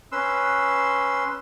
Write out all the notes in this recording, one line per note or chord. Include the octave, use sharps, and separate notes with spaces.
C#4 B4 C6 E6